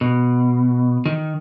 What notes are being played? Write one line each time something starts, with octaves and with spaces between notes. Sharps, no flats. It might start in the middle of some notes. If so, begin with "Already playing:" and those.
B2
D#3